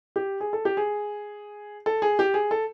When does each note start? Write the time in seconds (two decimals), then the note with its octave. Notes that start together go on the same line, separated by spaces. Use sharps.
0.16 G4
0.40 G#4
0.53 A4
0.65 G4
0.77 G#4
1.86 A4
2.02 G#4
2.19 G4
2.34 G#4
2.51 A4